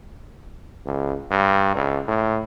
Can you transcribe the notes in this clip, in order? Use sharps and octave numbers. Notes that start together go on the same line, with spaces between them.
C#2
G2
C#2
A2